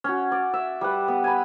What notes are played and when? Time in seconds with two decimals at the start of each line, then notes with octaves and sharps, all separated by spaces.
0.04 C#4 F#4
0.32 D5
0.54 E5
0.81 G3 B4 F#5
1.08 B3
1.24 G#5 B5